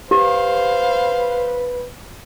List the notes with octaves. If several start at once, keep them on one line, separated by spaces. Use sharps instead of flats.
G4 B4 C5 F5